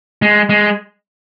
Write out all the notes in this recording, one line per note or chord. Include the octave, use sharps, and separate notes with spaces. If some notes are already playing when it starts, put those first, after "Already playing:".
G#3
G#3